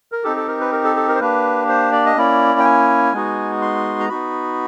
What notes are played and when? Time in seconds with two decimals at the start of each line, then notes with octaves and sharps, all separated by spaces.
0.12 A#4
0.24 C4 D#4 G4 A4
0.36 A4
0.48 A#4
0.60 B4
0.72 A#4
0.84 A4
0.96 A4
1.08 A#4
1.15 C5
1.20 A#3 D4 G4 B4
1.69 C5
1.92 D5
2.06 D#5
2.16 A#3 C#4 E4 D5
2.59 G5
2.64 G#5
3.13 G#3 B3 D#4 F#4
3.62 C6
4.00 A#5
4.09 B3 D#4 F#4 B5